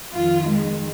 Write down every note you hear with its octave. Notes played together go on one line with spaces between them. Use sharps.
F2 D#3 F4
G#3